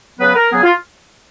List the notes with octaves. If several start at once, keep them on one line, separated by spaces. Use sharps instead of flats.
C#3 F#3 B3 B4
A#4
C#3 F#3 B3 G#4
F4